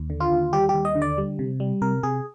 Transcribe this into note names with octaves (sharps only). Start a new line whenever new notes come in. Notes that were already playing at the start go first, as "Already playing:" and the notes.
Already playing: D#2
D3
F4
D#2
G3 G4
G4
D#2
D#5
D3
D5
G3
C3
G3
C3 A#4
C3 G#4